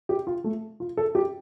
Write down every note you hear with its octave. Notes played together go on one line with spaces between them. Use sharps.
G4
F4
A3
F4
A4
G4